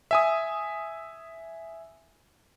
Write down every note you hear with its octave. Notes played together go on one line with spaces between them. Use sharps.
E5 G#5 D#6